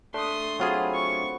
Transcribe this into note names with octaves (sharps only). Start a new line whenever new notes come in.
A3 D4 C6 D#6
F#3 C4 F4 F#4 G#4 B4
C#6